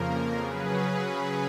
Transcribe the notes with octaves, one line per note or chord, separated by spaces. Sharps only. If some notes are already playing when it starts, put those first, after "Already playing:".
Already playing: F2 C#3 F3 A#3 A#4
C#3 F#3 C#4 G#4 B4